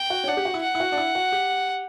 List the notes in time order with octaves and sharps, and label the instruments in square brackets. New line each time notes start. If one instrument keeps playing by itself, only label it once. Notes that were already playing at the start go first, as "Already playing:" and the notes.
Already playing: [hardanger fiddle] G5
[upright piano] F#4
C#4
[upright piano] D4 [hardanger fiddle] F#5
[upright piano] G4
F#4
E4
[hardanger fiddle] F#5
[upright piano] E4
F#4
D4
E4
F#4
G4